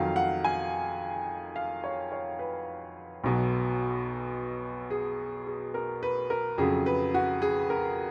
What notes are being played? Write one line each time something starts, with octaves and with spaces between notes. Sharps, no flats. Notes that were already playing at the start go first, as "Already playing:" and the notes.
Already playing: F2 D#3 F#3 F5
F#5
G#5
F5
C#5
C#5
B4
B1 B2 F#3
G#4
G#4
A#4
B4
A#4
F2 C#3 F#3 G#4
B4
F#4
G#4
A#4